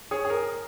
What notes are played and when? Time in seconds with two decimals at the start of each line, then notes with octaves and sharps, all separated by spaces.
0.11 G#4 C#5
0.25 G#4
0.30 A#4